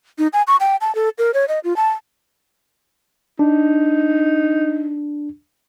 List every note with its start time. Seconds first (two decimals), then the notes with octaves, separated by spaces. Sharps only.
0.18 D#4
0.33 G#5
0.47 C#6
0.60 G5
0.81 A5
0.95 A4
1.18 A#4
1.34 C#5
1.48 D#5
1.64 F4
1.76 A5
3.39 D4 D#4